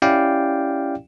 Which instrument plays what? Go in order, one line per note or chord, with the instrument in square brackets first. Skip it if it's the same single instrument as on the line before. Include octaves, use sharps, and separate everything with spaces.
[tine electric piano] C#4 E4 G4 D5 F5 G5